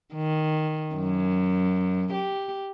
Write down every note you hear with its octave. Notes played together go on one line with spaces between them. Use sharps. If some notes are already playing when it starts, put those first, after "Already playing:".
D#3
F#2
G4